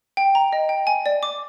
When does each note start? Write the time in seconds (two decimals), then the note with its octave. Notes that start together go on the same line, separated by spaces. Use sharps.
0.17 G5
0.35 A#5
0.53 D#5
0.69 G5
0.87 G#5
1.06 D5
1.23 D6